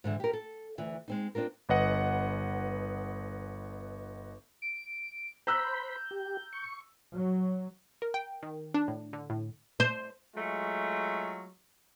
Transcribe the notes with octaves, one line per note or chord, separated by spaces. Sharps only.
G#2 D3 E3
G4 A#4
A4
D2 E3
G#3 C4 D#4
C4 D4 F4 A#4
G1 B4 D#5 F#5
D7
C5 A#5 B5 E6 F#6 G6
G4
C#6
F#3
A#4
G5
D#3
D4
A2
D3
A2
C5
F#3 G#3 A3 F4